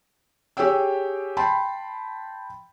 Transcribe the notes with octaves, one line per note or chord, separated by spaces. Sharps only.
G4 G#4 C#5 G5 E6
G5 A5 B5 C6